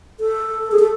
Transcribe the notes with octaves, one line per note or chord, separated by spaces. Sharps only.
A4
G#4
A4